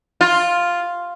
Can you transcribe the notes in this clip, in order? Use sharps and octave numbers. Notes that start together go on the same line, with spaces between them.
F4